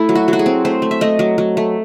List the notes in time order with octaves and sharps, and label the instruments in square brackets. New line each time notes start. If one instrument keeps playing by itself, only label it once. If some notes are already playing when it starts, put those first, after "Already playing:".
Already playing: [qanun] A3 E4
F#3
F#4
F#3 F#4
G#4
C4
A3 C5
A3
E5
A3 D#5
F#3
F#3
A3